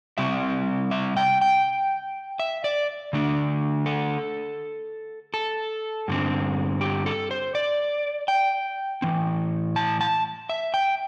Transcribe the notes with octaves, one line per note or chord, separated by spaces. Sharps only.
C3 G3 C4 E5
E5
G5
G5
E5
D5
D3 A3 D4
A4
A4
G2 D3 C4
G4
A4
C5
D5
G5
A2 E3 C4
A5
A5
E5
G5